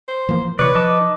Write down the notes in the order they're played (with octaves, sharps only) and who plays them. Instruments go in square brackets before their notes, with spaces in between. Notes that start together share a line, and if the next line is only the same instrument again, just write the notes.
[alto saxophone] C5
[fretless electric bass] E3 F3 A#3
[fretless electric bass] C3 E3 [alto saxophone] B4 [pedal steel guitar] C#5 D5
[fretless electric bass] F3 [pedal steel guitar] D#5 A5 D6
[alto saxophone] D#4